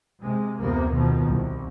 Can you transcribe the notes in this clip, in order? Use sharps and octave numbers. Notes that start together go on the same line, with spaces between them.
C3 G#3
F1 D2 C3 A#3 B3
B2 D#3 F3
C2